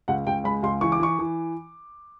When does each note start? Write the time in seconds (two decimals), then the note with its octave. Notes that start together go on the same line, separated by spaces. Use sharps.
0.08 C#2 F#5
0.27 C#2 G5
0.44 G#3 B5
0.63 C#2 C6
0.81 E3 C#6
0.92 D6
1.00 E3 C#6
1.19 E3